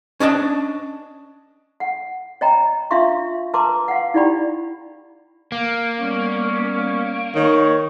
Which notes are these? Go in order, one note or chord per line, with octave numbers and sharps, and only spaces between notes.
C#4 D4 D#5 A5
F#5
C#5 D#5 G5 A#5 B5
D4 F4 E5 F5 C6 C#6
A#4 B4 A5 A#5 C6 D6
F5 F#5
D#4 E4 G4 D5 G5 B5
A#3
G3 B3 C#4
D#3 C#5